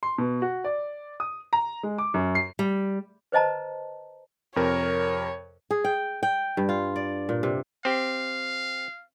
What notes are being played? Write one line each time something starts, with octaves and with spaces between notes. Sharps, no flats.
C6
B2
F#4
D5
D#6
A#5
G#3
D6
F#2
C7
G3
B4 C5 D#5 A5 A#5
F2 C3 A#4 C#5
G#4
G5
G5
G2
F4
D5
A#2
C3
C4 G4 F5